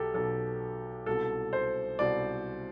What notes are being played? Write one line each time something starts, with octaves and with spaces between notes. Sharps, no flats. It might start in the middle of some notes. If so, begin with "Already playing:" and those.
Already playing: B1 B2 G4 A4
B1 B2 A4
C2 B2 A4
C5
C2 B2 D5